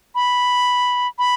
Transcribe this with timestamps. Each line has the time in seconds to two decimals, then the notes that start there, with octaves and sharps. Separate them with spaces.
0.15 B5
1.19 B5